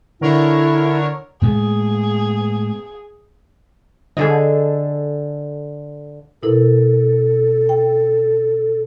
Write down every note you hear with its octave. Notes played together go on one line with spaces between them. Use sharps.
D3 E4 A#4 C#5
A2 G#3 B3 G#4
D3 G#4 A4 D#5
B2 E4 A4 A#4
G5